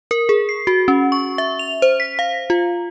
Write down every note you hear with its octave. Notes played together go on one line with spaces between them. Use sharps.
A#4
G#4
C7
F#4
C#4
C#6
E5
F7
C5
B6
F5
F4